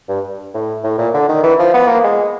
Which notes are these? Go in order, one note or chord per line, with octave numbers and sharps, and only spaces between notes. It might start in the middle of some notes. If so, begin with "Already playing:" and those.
G2
A2
A2
A#2
D3
D#3
E3
F3
B3
A#3
G#3